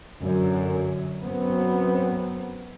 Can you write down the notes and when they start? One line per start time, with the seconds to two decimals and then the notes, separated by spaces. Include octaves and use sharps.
0.19 F#2 D3 F#3
1.23 F#2 F#3 B3 C4